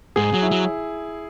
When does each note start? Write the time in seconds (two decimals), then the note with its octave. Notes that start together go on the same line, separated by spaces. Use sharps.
0.16 G#2 G#4
0.34 F#3
0.42 E4
0.51 F#3